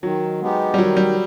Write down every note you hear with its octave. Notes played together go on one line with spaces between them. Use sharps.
D#3 F#3
G#3 B3 D#4 G4
G3
D#3 F#3
G3